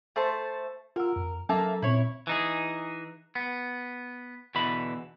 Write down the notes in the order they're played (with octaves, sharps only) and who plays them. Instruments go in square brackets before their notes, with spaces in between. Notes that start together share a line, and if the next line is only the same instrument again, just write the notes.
[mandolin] A3 C5 A5
[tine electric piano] F4 F#5 E6 [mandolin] A#4
[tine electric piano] F2
[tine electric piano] F#3 C#4 A4 [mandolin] A#3 E5 A5
[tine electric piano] A#2 C4 [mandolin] E4 C#5
[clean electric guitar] E3 D#4 G#4
B3
E2 B2 D3 E3 B5